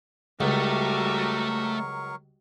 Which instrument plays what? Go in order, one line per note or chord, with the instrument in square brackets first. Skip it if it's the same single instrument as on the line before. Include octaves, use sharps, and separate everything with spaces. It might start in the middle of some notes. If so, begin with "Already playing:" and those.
[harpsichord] C#2 [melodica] F#3 A#4 C#6 [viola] G3 F#4 [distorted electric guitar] A3